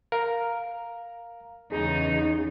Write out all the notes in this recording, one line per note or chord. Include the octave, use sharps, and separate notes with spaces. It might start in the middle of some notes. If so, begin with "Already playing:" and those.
A#4 F5 A#5
E2 C#3 D#4 G#4